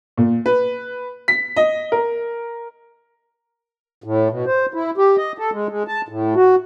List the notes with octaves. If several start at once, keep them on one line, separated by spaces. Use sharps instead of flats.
A#2
B4
B6
D#5
A#4
A2
B2
C5
E4
G4
D#5
A4
G#3
G#3
A5
A2
F#4